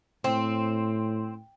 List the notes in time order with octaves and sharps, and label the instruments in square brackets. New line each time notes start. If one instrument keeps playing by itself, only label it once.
[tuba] A2 [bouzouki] C4